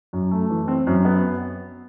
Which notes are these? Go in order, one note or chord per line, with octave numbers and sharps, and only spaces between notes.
F#2
A3
E3
C4
F#2
B3